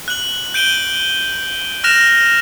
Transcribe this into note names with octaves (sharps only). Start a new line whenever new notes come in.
F#6 F#7
G6 D7 D#7 G7
F6 F#6 A#6 E7 F7